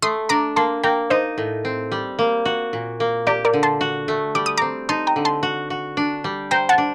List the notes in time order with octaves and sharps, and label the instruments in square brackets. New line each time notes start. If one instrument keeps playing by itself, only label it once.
[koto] A3 [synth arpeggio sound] C6 D#6
[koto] D4 [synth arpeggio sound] A#5 D6
[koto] A#3 [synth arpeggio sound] A5 C6
[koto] A#3 [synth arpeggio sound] G5 A#5
[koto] D#4 [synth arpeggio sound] C5 D#5
[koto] A2
C4
G3
A#3
F#4
A#2
A#3
[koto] G4 [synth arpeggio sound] A#4 D5
[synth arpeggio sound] A#4 D5
[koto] D3
[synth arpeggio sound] A5 C6
[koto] F#4
A3
[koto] G3 [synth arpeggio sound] D6
[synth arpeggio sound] D#6
[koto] C4 [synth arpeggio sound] A#5 D6
[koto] D#4 [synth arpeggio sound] A5 C6
[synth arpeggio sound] G5 A#5
[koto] D3
[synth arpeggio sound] A5 C6
[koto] F#4
F#4
D4
G3
[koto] C5 [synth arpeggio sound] G5 A#5
[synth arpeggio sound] F#5 A5
[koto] D4